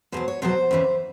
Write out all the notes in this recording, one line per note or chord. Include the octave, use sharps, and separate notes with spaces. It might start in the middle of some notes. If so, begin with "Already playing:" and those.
E2 B2 F#3 C5
C#5
E2 B2 F#3 C5
E2 C#3 E3